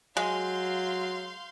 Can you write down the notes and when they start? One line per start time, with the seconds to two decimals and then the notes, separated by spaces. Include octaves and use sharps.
0.17 F#3 G#3 F5 C6 G6